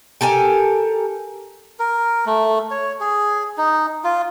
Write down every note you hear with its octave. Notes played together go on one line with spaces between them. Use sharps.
G4 A4 A#4 G#5
A#4
A3
C#5
G#4
D#4
F4